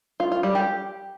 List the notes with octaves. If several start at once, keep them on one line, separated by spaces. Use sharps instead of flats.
F4
F4
G3
G4